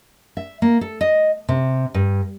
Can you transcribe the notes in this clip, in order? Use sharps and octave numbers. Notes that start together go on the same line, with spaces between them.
E5
A#3
A4
D#5
C3
G2